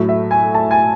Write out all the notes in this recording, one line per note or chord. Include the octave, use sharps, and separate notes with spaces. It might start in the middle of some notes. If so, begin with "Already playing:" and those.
Already playing: A2 F#3 A3
E5
G#5
A5
G#5